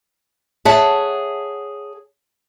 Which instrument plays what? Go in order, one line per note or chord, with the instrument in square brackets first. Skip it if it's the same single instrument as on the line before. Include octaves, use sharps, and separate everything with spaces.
[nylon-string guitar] G#4 C#5 E5 F#5 A5